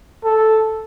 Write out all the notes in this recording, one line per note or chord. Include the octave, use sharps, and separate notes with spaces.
A4